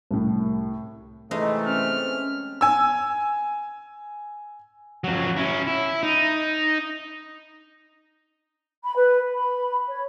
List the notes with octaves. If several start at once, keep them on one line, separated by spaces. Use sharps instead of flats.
C2 A2
C3 E3 G#3 A3 D#4
C4 C#4 F6
G#5 E6
F2 F#3
C#4 E4
E4
D#4
B5
B4
B5
C#5